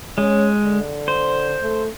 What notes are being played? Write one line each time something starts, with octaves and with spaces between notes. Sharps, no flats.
G#3 C#4
D3
C5
A3